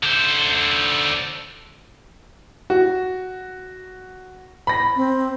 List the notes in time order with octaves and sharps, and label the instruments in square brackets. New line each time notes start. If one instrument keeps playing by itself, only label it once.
[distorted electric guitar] D3 C5
[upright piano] F#4
B5 A#6
[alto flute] C4